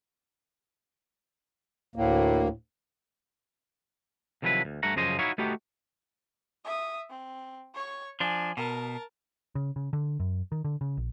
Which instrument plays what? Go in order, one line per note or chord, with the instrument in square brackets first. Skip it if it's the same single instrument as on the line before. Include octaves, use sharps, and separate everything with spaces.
[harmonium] D2 A#3 [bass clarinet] A2
[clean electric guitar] C3 D#3 F3 F#3 E4 B4
D2
G2 A3 F#5 A#5
F#2 C#3 F3 C5 D#5 C6
D#4 E4 F#4 C#5 D#5 F5
A3 B3 D#4 F#4 G4
[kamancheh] E5 D#6
C4
C#5 C#6
[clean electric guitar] F3 D4 [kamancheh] G#5
[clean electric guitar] B2 [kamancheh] A#4 A5
[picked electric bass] C#3
C#3
D3
F#2
D#3
D3
C#3
A#1